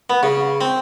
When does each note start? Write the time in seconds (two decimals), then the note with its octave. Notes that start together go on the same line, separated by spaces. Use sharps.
0.10 B3
0.23 C#3
0.61 C4